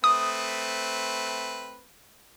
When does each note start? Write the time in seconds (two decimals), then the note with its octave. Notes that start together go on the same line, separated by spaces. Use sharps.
0.04 A3 C4 B4 D#6